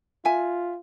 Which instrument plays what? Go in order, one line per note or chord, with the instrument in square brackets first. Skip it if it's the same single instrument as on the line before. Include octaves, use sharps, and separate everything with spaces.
[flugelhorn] F4 [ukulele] E5 G#5